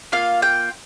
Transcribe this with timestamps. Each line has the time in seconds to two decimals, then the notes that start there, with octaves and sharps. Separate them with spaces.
0.12 A#3 F4 F5
0.42 G5